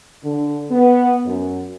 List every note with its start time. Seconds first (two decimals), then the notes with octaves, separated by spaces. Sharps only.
0.24 D3
0.71 B3
1.26 F#2